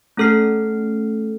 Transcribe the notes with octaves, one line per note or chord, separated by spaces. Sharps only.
A3 C#4 A4 F6 C7